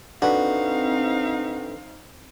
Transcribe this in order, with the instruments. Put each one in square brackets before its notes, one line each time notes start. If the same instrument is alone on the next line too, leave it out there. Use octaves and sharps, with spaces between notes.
[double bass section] C4 [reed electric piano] D4 A4 B4 [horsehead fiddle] D#4 F5 [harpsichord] F#4